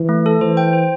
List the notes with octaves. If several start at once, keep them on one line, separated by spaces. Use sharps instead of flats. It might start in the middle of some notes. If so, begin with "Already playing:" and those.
Already playing: E3
A3
A4
E3 C5
G5
C5